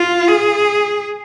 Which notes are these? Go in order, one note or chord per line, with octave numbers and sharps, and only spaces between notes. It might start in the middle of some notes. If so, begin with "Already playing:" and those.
Already playing: F4
G#4